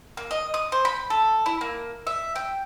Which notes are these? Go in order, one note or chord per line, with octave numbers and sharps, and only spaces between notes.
A#3
D#5
D#6
C5
B5
A4
E4
A#3
E5
G5